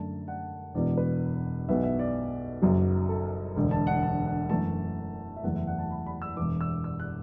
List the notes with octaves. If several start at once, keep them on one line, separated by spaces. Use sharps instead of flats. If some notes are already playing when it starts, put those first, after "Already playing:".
Already playing: F#2 D3 A3 A5
F#5
E1 E2 B2 D5
B4
B1 B2 B3 E5
E5
D5
F#1 F#2 F#3
A4
E1 D2 D3
A5
F#5
A5
F#5
F#2 E3 A3 A5
E5
F#1 E2 E3 A3 F#5
E5
F#5
A5
B5
B5
E6
E1 E2 E3 D6
E6
E6
F#6